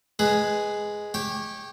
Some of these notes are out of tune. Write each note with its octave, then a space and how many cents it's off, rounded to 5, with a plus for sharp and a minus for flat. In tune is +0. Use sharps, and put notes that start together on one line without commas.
G#3 +0 G#4 +0 B4 +0
G4 +0 C#5 -25 G5 +0